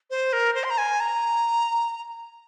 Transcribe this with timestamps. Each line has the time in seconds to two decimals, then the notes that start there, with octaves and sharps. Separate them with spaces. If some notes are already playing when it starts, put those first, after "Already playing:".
0.10 C5
0.33 A#4
0.55 C5
0.64 C6
0.70 A#5
0.78 G#5
1.00 A#5